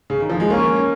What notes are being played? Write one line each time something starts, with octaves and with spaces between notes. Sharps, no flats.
C#3
D#3
F3
G#3
A#3 C#4